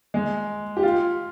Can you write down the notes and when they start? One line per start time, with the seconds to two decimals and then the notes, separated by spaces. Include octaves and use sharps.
0.14 G#3
0.77 G4
0.83 F4